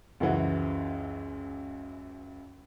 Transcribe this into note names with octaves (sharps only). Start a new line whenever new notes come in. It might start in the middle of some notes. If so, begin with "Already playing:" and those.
C#2 F#2 E3 F#5